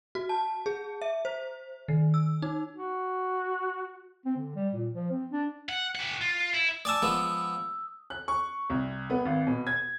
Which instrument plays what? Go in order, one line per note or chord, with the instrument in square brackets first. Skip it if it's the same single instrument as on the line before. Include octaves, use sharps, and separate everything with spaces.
[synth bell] F#4
A5
G#4
E5
C5
D#3
E6
D#4
[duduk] F#4
[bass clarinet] C4
D3
G3
A#2
F3
C4
D4
[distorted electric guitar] F#5
G4 F#5
F4
E4
[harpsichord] D5 G#5 A5 [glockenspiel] D#6 E6
[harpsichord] F3 G#3 B3
[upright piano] F#6
C#6
C2
B3
G#1
B2
G#6